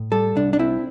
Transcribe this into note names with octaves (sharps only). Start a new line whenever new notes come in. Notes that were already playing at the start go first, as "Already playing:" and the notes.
Already playing: A2
G3 A4
C2 D4
D4
C4 E4